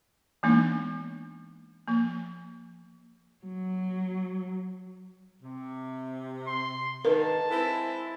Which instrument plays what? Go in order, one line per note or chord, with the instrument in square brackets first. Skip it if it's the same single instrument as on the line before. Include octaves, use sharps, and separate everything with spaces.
[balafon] E3 G#3 A#3 B3 D4 D#4
F3 A#3
[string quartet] F#3
[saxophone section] C3
[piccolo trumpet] C6
[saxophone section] G#2 D3 D#3 [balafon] A#4 B4 [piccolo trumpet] A5
[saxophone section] G#3 C4 E4